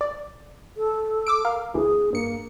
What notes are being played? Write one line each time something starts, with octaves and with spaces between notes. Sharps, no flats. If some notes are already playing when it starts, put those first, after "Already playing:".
D5
A4
D6 E6 D7
A#4 F5
D2 E3 G#4
G2 A#3 C#7